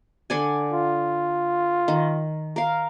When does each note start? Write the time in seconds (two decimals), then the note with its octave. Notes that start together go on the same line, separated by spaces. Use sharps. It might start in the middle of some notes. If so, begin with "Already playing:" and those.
0.30 D3 D5 G#5
0.73 F4
1.88 D#3
2.56 A#4 F5